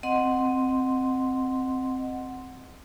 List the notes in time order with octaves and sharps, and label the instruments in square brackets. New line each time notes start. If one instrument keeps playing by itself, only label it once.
[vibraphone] C4 D#5 F#5 C6